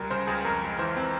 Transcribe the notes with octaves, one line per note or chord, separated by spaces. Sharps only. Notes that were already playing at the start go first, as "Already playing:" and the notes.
Already playing: C#2 G3 A#4
C#3 C5
C#2 G#4
F2 A#4
G#3
E3 C5
C4